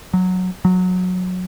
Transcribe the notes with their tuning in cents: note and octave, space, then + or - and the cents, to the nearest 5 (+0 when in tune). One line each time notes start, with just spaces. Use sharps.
F#3 -10
F#3 -20